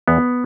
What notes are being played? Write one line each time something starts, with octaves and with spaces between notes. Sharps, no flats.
E2 B3